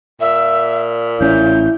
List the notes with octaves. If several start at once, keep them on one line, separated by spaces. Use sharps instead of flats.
A#2 E5
A1 C#4 E4 G6